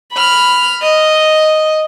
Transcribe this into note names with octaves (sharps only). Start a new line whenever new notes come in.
B5 F6
D#5